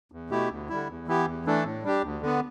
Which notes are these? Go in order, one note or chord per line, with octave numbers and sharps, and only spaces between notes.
E2
B2 A3 E4 G4
D2
D3 G3 E4
E2
E3 B3 E4 G4
E2
E3 A3 D4 A4
A2
G3 D4 G4
D2
D3 B3